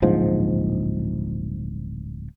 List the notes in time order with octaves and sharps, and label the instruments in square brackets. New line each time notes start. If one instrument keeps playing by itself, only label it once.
[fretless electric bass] D1 A#1 G#2 F3